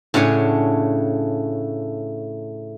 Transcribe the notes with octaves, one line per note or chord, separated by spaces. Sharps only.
A2 C#3 D4 F#5 G#5